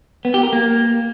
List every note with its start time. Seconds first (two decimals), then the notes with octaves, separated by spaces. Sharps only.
0.25 B3
0.34 G4
0.43 A#4
0.53 A#3